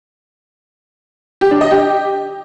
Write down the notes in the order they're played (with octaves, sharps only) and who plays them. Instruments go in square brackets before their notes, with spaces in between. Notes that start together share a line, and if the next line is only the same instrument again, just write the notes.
[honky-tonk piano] G4
D4
D#5
G4